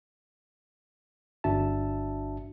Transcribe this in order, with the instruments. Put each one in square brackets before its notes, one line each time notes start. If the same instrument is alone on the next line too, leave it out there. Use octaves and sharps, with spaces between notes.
[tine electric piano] G1 D4 F#4 E5 A5